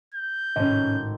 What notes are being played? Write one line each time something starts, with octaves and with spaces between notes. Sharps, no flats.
G6
G#1 A2 C#4 D#5